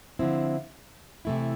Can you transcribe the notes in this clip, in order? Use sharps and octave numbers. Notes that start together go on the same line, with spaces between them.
D3 F3 C4 E4
C3 E3 A3 E4